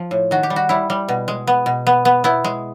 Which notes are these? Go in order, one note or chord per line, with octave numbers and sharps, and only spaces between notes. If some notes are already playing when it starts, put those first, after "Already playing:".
Already playing: F3 F4
A2
D#3 F#4
G4
G3
F#4
G3 E4
G3
B2
G#3
B3
B2
B3
B3
B3 E4
G#3